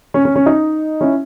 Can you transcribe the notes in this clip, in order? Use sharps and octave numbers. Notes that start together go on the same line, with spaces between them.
C#4
C#4
C#4
D#4
C#4 E4